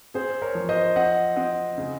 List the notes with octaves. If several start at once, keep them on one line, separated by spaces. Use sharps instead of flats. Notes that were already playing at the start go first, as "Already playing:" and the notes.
C4 G#4 C5
A#4 C#5
F3
C5 D#5
C4 D#5 F#5
C4 D#5 F#5
C#3